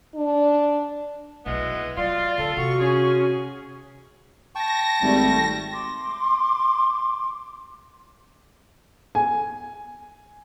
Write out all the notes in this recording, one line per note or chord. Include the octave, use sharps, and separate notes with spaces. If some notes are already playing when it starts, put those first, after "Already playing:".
D4
B1 E3 G#3 B3
F#3 F4 D5 C6
D3 A4
C3 F#4 C#6
C#4 G#4
G5 A5 C#6 A#6
G#1 G3 A3
C6 D6
G#5